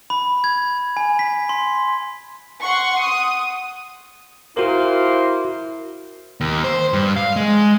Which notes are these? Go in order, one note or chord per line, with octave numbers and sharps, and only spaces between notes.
B5
G#6
G#5
B6
C6
F#5 C6 C#6
D#6
A#2 A#3 E4 F#4 A#4 C5
D#2
C5
G2
F5
G#3